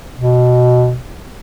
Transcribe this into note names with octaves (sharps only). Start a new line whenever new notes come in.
B2